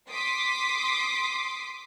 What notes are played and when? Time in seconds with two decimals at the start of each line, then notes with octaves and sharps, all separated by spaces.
0.10 C6 D6 D#6 B6 C7